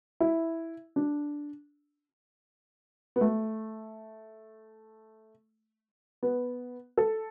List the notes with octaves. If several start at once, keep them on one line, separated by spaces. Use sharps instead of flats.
E4
D4
B3
A3
B3
A4